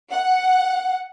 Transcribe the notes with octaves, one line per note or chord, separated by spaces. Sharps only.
F#5